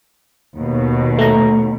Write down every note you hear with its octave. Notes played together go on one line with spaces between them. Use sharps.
D#2 B2
A3 A#5